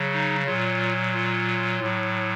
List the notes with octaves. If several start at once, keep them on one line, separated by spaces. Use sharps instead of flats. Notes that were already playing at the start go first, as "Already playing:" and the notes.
Already playing: C#3 F#3
D#4
A#2 F#3 F4
F4
A2 F#3